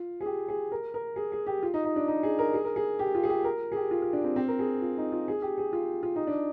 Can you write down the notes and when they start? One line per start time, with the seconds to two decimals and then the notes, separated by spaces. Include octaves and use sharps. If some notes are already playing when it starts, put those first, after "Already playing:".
Already playing: F4
0.21 G#4
0.26 G4
0.48 G#4
0.72 A#4
0.94 A#4
1.16 G#4
1.32 G#4
1.47 G4
1.63 F4
1.74 D#4
1.85 D#4
1.96 D4
2.08 D#4
2.23 G#4
2.39 A#4
2.54 G#4
2.65 A#4
2.76 G#4
2.99 G4
3.15 F4
3.23 G#4
3.30 G4
3.44 A#4
3.72 G#4
3.76 G4
3.91 F4
4.02 F4
4.13 D4
4.24 C4
4.36 C4
4.48 A#4
4.59 G#4
4.81 F4
4.98 D#4
5.12 F4
5.28 G#4
5.42 G4
5.58 G#4
5.73 F4
6.03 F4
6.16 D#4
6.27 D4